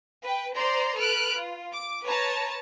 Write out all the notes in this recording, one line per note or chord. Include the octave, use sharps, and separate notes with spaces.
B4 G5
C5 D5 A#5 C6
A4 B4 F6 F#6 D7
F4
D6
B4 C#5 A5 A#5